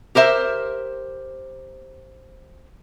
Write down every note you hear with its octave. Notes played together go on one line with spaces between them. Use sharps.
G4 A#4 C5 E5